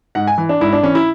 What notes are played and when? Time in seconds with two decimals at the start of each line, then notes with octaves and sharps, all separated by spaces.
0.15 G#2 F#5
0.27 G#5
0.38 E3
0.49 D4
0.61 G#2 E4
0.73 D4
0.83 E3 C#4
0.95 E4